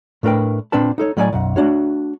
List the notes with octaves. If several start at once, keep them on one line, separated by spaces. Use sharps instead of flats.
A2 A3 D4 A#4 B4 G5
A#2 C4 D4 B4 A5
D#4 A4 C#5
A2 F#3 D5 D#5 F5 G#5
B1 F#2 F#5
A3 D4 F#4 C#5